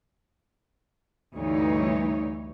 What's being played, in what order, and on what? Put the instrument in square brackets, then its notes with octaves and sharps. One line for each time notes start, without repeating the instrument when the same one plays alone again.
[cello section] D2 G2 E3 D#4 C#5